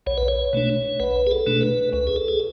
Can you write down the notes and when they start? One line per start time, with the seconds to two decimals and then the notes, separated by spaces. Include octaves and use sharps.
0.07 B1 C#5
0.18 B4
0.28 C#5
0.53 B2 A3 D4
1.00 B1 B4
1.27 G#4
1.31 A4
1.46 B2 A3 D4
1.61 B4
1.93 C#2 B4
2.07 G#4
2.16 A4
2.28 G#4